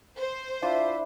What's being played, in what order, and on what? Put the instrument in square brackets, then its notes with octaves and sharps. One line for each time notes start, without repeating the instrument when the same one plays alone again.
[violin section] C5
[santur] D4 E4 [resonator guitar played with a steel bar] F4 [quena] E5